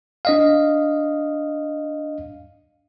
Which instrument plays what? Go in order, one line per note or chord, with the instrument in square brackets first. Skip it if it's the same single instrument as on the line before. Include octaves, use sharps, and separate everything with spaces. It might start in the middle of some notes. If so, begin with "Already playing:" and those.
[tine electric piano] D4 D#5 F5